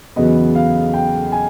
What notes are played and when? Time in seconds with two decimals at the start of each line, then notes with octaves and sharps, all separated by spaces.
0.16 E2 C#3 F#3 B3 D#5
0.55 F5
0.93 G5
1.32 G#5